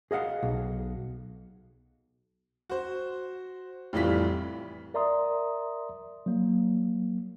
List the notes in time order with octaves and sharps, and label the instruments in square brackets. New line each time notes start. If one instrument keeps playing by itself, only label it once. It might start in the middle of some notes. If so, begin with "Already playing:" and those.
[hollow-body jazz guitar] G#4 D#5 F5 F#5
B1
[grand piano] F#4 C5
F1 A2 E3 G3 F4 B6
[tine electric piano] A#4 D5 E5 A#5 C6 D#6
F#3 A#3